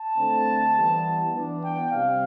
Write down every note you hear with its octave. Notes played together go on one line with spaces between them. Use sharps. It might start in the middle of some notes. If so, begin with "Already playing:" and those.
Already playing: A5
D3 A3 C4
E3 G3 B3
E3 B3 D4
G5
C3 G3 F5